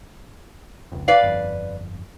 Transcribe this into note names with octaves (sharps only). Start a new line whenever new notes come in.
F1 C#2
B4 D5 F5
G1 F2